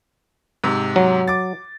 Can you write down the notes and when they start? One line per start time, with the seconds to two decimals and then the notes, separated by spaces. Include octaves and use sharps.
0.64 G#2 C3
0.96 F#3
1.28 D6 A6